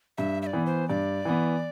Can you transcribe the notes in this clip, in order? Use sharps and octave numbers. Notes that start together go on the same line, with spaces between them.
G2 E5
E5
D5
E3 B3
C5
G2 D5
E3 B3